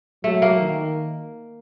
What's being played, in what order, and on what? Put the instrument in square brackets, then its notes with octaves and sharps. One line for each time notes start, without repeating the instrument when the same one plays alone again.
[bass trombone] F#3 [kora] A3
[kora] A#3
[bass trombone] D#3